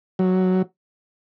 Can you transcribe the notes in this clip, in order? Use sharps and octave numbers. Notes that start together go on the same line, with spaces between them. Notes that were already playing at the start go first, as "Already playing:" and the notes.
F#3